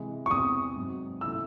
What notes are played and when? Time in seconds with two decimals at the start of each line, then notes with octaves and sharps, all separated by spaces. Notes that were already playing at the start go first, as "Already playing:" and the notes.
Already playing: C3 E3 G#3
0.26 C#6
0.30 E2 C3 E3 C4 D#6
0.76 G#2 F#3 C4
1.21 C3 E3 A3 C#4 E4 E6